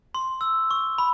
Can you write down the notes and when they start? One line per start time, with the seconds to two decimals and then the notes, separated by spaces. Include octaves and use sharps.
0.15 C6
0.41 E6
0.71 C#6
0.98 B5